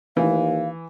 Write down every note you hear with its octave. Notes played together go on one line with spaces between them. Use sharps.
D#2 E3 F5